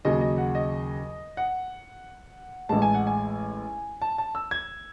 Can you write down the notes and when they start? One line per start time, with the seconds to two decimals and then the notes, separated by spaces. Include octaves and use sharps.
0.05 D#2 C#3 F#3 D#5
0.21 D#5
0.38 F#5
0.55 D#5
1.37 F#5
2.69 A1 A2 G#3 A5
2.82 G#5
2.94 F#5
3.07 G#5
4.02 A5
4.18 A5
4.35 E6
4.51 G#6